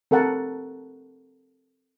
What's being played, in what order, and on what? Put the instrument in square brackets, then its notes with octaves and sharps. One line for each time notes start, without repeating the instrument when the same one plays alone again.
[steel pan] C4 A4 A#4 F#5 A5